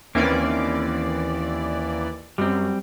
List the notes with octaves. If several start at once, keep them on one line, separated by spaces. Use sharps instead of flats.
D#2 E3 A#3 C4 C#4 D5
F#2 G3 C4